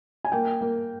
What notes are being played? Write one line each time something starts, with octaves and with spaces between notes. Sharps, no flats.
G#5
A#3 G5
A#3